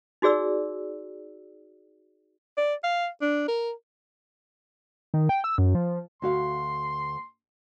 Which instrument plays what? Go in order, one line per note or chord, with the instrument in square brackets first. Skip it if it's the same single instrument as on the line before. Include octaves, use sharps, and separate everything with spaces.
[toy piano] D#4 F#4 G#4 D5 E6
[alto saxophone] D5
F5
D4
A#4
[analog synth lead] D#3
G5
E6
F#2
F3
[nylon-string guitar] D2 F#4 F5 [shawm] C6